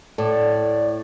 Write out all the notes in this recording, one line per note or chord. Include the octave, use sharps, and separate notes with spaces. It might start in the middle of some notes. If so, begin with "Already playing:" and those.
A2 A4 D5